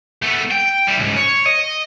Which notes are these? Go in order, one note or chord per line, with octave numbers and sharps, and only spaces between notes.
A3 B3
G5
G3 E4
C#2 G#2
C#5
D#5